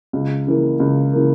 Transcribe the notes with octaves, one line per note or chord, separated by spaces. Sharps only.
C#2
C#3 E3 A#3
C#2
C#3 E3 A#3